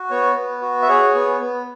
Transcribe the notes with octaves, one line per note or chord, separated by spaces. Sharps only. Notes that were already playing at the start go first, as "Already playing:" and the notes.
Already playing: F#4
B3 C#5
B3
F#4
E5
G#4 C#5
B3
B3